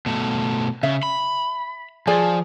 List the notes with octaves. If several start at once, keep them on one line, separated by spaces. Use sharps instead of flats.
B2 A3
C#3 E5
B5
F3 G#4 D5 G#5